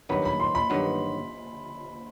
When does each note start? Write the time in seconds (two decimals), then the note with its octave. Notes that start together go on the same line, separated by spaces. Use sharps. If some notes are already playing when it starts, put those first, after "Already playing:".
0.09 G2 D#3 F#3 B3 B5
0.25 B5
0.40 C6
0.55 B5
0.70 G2 D#3 F#3 B3